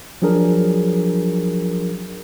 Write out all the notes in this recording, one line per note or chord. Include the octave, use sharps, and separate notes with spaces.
F3 F#3 D4 G#4 A#4